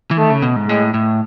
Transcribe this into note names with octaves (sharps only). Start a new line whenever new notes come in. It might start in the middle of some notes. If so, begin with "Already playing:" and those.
E3
D#3 A3
C#3
B2
G#2
A2 G#3
A2